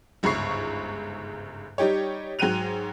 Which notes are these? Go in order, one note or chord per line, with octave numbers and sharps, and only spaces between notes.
G1 C#2 G#2 B5 C#6 C7
G3 D#4 G4 C#5
G#2 F#3 G5 F#6 D#7 F7